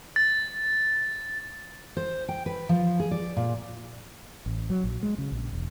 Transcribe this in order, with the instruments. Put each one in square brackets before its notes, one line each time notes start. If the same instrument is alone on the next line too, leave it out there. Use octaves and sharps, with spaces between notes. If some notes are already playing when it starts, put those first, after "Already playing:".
[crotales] A6
[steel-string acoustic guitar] C5
G5
B4
F3
G#4
D5
A#2
[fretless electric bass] A1
F#3
A#1
G#3
C#3
A#1
E1